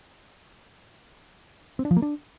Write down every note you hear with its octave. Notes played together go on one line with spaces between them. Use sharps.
C4
D4
F3
A#3
D4